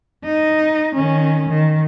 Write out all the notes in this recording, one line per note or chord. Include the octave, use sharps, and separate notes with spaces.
D#4
D#3 C#4
D#3